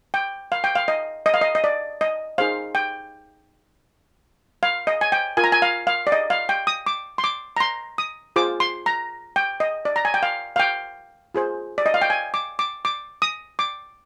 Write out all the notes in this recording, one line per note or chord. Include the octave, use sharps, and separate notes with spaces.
G5
F5
G5
F5
D#5
D#5
F5
D#5
D#5
D5
D#5
D#4 G#4 C5 F5
G5
F5
D#5
G#5
G5
F4 A#4 G#5
A#5
G#5
F5
F5
D5
D#5
F5
G5
D#6
D6
C6
D6
A#5
C6
D#6
F4 G#4 C5 D6
C6
A#5
G5
D#5
D5
A#5
G#5
G5
F5
F5
G5
F4 G#4 C5
D5
D#5
F5
G5
G#5
D6
D6
D6
D#6
D6